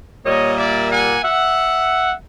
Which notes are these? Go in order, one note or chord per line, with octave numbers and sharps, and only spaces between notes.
A#2 G3 A#3 C#5 D#5
D5 E5
F#5 G#5
E5 F#5